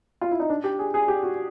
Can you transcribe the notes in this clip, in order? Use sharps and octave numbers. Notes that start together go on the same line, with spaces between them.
F4
E4
D#4
D4
G4
G#4
G#4
G4
F#4